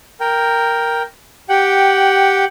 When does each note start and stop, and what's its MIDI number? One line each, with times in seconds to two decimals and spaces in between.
0.20 1.03 70
0.20 1.03 79
1.49 2.45 67
1.49 2.45 78
1.49 2.45 79